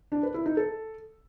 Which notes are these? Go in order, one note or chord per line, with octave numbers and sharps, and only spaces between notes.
D4
B4
E4
D#4
A4